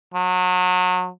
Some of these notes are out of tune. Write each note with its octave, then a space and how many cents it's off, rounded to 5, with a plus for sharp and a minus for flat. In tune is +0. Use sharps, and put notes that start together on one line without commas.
F#3 -30